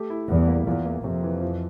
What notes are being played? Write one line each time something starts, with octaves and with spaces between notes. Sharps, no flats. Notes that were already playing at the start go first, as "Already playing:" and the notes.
Already playing: A3 G4
E4
E2 G3
A#3
E2 F4
A#3
F2 C3
E3
F3